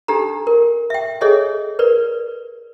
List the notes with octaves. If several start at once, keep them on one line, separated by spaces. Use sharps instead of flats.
D4 D#4 G4 A4 A#5
A#4
E5 G5
G#4 A4 C#5 D#5 E5 G#5
A#4 B4 D5